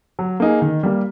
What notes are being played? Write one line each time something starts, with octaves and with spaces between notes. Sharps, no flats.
F#3
A#3 D#4 G#4
D#3
G3 A#3